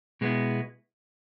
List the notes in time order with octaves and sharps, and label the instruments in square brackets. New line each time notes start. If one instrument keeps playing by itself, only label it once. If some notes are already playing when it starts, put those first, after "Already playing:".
[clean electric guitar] B2 G#3 B3 E4